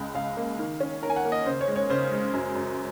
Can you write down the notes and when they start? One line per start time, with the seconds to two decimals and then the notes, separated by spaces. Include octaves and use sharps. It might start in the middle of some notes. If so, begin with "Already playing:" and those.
Already playing: C#2 C#3 G#3
0.14 C#2 F5
0.37 A#3
0.59 D#3
0.80 C#4
1.03 D#3 A#4
1.10 G#5
1.16 F#5
1.25 A#3
1.32 D#5
1.46 C#3 C5
1.61 C#5
1.68 G#3
1.76 C#5
1.90 C#3 C5
2.11 G#3
2.34 F#2
2.55 F#2